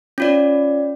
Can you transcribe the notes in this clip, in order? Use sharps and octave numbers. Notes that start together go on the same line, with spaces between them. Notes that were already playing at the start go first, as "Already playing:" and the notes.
C#4 F4 D5